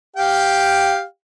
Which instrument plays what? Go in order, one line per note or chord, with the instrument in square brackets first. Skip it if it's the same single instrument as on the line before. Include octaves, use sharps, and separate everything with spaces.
[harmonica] G4 F5 G5